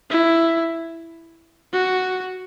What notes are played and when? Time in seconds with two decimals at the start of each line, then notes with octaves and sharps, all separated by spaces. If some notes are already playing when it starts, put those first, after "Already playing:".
0.10 E4
1.73 F#4